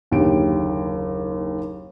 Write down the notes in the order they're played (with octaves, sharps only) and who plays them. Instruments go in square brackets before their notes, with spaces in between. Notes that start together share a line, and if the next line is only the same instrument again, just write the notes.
[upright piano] F#1 D#2 D3 G4 D7